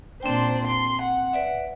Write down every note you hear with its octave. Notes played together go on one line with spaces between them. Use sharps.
A#2 C4 D4 C5 G5
C6
F#5
B4 D5 E5